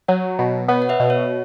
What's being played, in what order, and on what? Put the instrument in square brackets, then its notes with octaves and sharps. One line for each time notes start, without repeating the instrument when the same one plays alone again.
[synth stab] F#3 [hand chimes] C#5 F#5
[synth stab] B2
[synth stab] B3 [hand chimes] C#5 F#5
[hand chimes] F#5
B4 E5
[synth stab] B2
[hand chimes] C#5